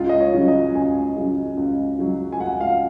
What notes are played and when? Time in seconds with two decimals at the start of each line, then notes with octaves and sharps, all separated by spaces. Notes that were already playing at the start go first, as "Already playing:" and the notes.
Already playing: C#2 F4
0.09 D#5
0.20 C#5
0.34 C#3 F#3
0.48 D#5
0.75 C#2 G#5
1.16 C#3 F#3
1.57 C#2
1.98 C#3 F#3
2.32 G#5
2.40 C#2 F#5
2.61 F5